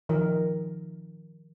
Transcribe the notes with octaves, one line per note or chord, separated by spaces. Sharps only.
D#3 F3 A#4